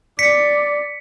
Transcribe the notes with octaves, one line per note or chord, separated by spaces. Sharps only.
D5 B6 C#7